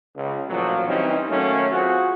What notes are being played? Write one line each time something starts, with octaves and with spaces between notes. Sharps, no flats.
C#2
A1 A#2 F3 F#3
E3 G3 C4 C#4 D#4
D#3 F#3 A3 A#3 C#4
C4 F4 F#4 G#4